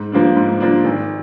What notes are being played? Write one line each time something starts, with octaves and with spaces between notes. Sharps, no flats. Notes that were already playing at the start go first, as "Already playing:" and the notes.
Already playing: G#2
F3 A#3 D4
G#2
F3 A#3 D4
G#1